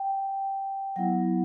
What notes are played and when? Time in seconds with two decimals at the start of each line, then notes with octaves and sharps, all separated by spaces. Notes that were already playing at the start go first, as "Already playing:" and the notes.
Already playing: G5
0.96 F#3 B3 E4 F#5